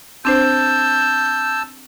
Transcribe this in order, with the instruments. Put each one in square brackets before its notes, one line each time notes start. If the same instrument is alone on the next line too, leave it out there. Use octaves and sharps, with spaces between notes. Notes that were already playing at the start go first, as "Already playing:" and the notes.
[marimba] C4 D4 C5 [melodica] A5 E6 [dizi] G6